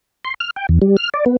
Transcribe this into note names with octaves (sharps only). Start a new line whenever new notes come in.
C6
F6
G5
E2
G3
F6
D5
B3